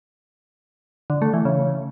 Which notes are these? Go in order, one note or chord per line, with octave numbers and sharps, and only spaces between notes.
D3
A3
E3
C#3